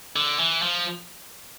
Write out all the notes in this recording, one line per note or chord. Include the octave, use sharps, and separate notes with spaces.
D3
E3
F3